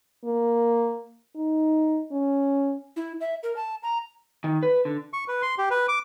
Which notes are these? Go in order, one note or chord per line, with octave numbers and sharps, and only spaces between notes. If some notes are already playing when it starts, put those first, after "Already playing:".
A#3
D#4
C#4
E4
E5
A#4
A5
A#5
D#3
B4
D3
C#6
B4
C6
G4
B4
D6